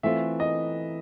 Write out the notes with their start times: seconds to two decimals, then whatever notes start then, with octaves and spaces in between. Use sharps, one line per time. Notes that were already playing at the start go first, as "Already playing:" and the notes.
0.03 E3 A3 C4 F4 E5
0.40 D#5